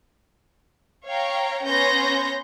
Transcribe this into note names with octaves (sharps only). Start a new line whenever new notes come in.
C#5 F5 G5 A#5
B3 C#4 C#5 C6 G6 A#6